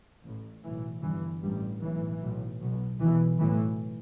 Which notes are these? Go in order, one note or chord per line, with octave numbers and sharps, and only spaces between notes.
A1 A2
B1 A2 E3
G1 G2 E3
A1 G2 G3
B1 A2 E3
B1 A2
B1 B2
B1 B2 E3
B1 A2 E3